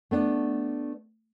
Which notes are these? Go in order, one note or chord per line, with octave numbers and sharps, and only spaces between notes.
A3 B3 D4